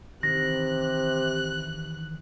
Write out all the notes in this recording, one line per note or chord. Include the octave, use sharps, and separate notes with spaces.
C3 D#3 E3 F#6 A#6